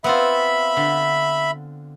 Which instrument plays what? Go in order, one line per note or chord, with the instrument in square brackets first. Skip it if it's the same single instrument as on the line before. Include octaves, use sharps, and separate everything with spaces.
[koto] B3 C4 F4 [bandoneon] E5 B5
[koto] D3